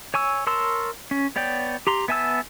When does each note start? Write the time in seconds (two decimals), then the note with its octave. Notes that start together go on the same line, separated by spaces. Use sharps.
0.14 C#5 G#5 C#6 E6
0.47 A#4 C#5 A5 C6 E6
1.11 C#4
1.36 B3 C#5 D5 G5
1.87 G4 A#5 C6
2.08 B3 E5 G#5 A5 E6